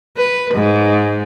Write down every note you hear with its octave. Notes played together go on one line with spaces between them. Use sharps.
B4
G#2